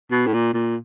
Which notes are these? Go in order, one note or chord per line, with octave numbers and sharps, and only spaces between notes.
B2
A2
A#2
A#2